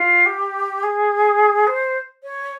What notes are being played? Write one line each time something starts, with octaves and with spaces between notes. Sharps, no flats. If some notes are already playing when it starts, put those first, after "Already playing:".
Already playing: F4
G4
G#4
C5
C#5